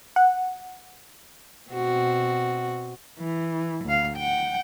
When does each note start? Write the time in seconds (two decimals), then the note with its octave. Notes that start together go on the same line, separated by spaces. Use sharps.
0.16 F#5
1.70 B2 C4 F#4
3.19 E3
3.85 D2 F5
4.17 F#5 G5